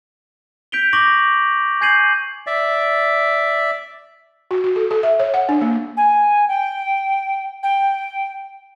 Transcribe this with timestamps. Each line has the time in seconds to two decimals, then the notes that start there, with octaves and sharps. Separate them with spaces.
0.72 G6 B6 D7 F7 G7
0.93 C#6 D6 A#6 F#7 G7
1.81 G#5 G6 G#6 C7 D#7 F#7
2.47 D5 E5
4.51 F#4
4.64 F#4
4.76 A4
4.91 A4
5.03 E5
5.19 C#5
5.34 F#5
5.49 D4
5.61 A#3
5.97 G#5
6.48 G5
7.63 G5